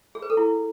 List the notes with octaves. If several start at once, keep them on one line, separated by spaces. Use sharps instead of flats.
G#4
B4
A4
E4